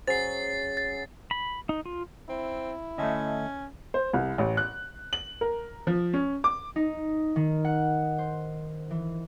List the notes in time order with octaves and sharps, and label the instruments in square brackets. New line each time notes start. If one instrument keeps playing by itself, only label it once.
[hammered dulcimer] F#3 C#4 G#4 [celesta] C5 [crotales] A6 C7
[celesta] A6
[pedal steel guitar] B5
D#4
F4
[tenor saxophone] C4 [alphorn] E4
[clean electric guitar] D2 A3 [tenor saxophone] C#4 [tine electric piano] D#5 E5 A5
[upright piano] C5
C2
A1
F#6
F#7
A#4
F3
C#4
D6
[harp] D#4
D#3
F#5
C5
E3